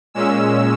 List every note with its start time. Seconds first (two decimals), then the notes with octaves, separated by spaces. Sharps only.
0.14 A#2 G#3 C#4 E6